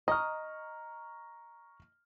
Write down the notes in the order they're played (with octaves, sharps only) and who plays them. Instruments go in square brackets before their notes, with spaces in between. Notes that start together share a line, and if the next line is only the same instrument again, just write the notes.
[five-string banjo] D#5 [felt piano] A#5 C#6 F6